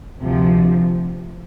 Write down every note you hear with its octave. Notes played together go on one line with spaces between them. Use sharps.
D2 C3 F3